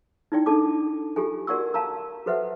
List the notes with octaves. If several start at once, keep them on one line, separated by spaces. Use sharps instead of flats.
D#4 E4 D5 G5
D4 D#4 A4 A5 D6
F4 G4 A4 G#5
F#4 A#4 D5 F#5 C#6 E6
F5 A5 A#5 E6
F#4 A4 B4 C5 E5 F#5